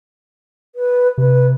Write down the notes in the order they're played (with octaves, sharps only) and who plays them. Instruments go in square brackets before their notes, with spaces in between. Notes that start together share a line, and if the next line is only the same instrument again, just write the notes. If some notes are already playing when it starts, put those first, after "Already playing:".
[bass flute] B4
[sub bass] C3 [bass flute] B4